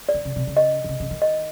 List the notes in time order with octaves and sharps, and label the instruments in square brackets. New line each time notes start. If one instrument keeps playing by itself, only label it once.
[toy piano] D5
[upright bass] D3
C#3
C3
C#3
[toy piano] D#5
[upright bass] D3
C#3
C#3
D#3
[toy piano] D#5